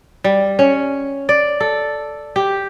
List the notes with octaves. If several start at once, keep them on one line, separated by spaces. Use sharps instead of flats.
G3
C#4
D5
A4
G4